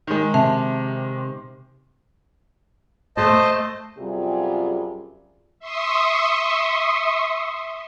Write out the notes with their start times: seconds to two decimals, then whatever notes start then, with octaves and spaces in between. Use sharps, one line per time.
0.07 D#3 G#3
0.34 C3 E5 A5
3.17 A3 C5 D#5 A5
3.99 F#2 C3 G3 F4 G#4
5.60 E5 C6 C#6 D#6